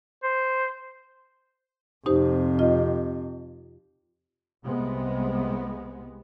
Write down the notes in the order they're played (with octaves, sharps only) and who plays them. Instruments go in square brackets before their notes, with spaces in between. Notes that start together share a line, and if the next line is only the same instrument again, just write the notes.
[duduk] C5
[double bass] F2 C3 [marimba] D#4 G4 C5
[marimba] F4 D#5
[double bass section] C2 C3 G#3 B3